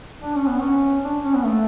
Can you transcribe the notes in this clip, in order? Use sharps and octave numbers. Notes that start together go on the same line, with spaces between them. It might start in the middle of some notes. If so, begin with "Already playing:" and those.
D4
C#4
B3
C#4
D4
C#4
B3
A3